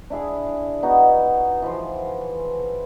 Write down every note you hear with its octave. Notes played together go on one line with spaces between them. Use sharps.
D4 E4 G#4
B3 D#4 F#4
E3 F3